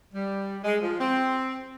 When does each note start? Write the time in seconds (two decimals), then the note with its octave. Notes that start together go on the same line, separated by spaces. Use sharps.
0.14 G3
0.64 G#3
0.81 F3
1.00 C4